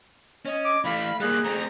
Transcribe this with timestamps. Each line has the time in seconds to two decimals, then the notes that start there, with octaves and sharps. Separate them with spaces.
0.46 C#4 D#5
0.65 D6
0.85 E3 A3 F5 B5
1.20 G3 A#3 G#4 F#6
1.44 A3 C4 A#5